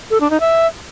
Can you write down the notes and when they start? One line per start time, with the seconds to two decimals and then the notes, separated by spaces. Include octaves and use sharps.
0.10 A4
0.20 D4
0.30 D#4
0.40 E5